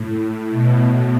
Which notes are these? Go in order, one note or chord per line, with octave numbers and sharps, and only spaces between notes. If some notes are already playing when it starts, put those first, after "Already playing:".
Already playing: A2
B2
B2